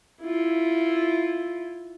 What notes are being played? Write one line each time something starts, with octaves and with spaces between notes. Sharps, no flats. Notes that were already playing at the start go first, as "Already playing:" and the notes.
E4 F4